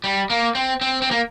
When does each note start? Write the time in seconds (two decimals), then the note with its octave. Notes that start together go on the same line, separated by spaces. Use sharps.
0.04 G3
0.30 A#3
0.55 C4
0.81 C4
1.02 C4
1.11 A#3